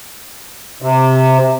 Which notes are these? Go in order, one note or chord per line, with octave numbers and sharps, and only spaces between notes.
C3